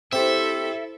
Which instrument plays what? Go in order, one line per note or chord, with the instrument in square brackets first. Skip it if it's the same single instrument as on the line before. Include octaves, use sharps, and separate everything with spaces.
[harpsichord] C4 G4 [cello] E4 A4 [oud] C5 [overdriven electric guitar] E5